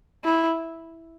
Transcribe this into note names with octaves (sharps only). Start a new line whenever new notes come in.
E4